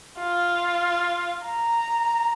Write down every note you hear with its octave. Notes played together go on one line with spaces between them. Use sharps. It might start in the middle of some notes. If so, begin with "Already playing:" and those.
F4
A#5